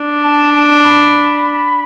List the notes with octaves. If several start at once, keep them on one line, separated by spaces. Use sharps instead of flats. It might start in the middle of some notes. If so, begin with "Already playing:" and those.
Already playing: D4
A5
A5
B5